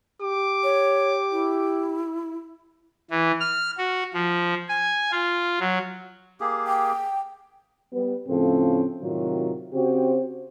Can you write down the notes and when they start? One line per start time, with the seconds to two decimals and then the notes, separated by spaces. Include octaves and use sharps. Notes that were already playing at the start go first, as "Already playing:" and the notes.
0.22 G4 D6
0.64 C#5
1.32 E4
3.11 E3
3.40 F6
3.78 F#4
4.13 F3
4.69 G#5
5.11 F4
5.60 F#3
6.40 A#3 G4 G#4
6.67 G5
7.92 G3 B3 B4
8.28 A2 C#3 F3 C4 C#4 A4
9.03 A2 C3 D#3 F#3 F4 F#4
9.73 C#3 C4 F#4 G4 C5